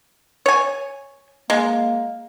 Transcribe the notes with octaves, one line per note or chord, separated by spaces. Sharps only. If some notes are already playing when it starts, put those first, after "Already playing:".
C#5 G#5
G#3 A#3